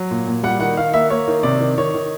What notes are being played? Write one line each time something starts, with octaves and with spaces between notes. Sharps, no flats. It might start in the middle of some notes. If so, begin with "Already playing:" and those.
Already playing: F#3
A#2
A#2
G3 F#5
D#3 F#5
D#3 F5
A#3 E5
A#3 C#5
D#3
C3 D5
D#3
D#3 C#5
D#3